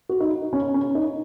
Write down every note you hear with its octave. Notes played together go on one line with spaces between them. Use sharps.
F#4
D#4
C#4
C#4
D#4